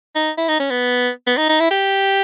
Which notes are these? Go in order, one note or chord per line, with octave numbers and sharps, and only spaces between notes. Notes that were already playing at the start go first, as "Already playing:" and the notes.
D#4
E4
D#4
C#4
B3
B3
D#4
D#4
E4
G4